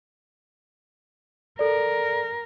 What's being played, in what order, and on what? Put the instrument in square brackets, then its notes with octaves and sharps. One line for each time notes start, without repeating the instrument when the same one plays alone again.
[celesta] A4 D5 [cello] A#4